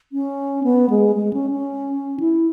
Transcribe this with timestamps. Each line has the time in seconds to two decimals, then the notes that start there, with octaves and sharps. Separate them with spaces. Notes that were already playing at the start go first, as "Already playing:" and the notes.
0.12 C#4
0.64 B3
0.90 G#3
1.16 G#3
1.33 C#4
1.51 C#4
2.20 E4